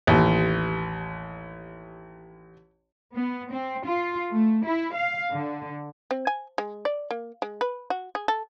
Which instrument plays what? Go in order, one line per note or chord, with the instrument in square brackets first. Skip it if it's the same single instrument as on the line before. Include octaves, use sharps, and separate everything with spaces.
[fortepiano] A1 D#2
[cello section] B3
C4
F4
A3
E4
F5
D3
[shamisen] C4
G#5
G#3
D5
A#3
G#3
B4
F#4
G#4
A4